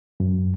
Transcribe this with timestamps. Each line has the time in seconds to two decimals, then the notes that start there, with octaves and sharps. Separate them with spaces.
0.20 F#2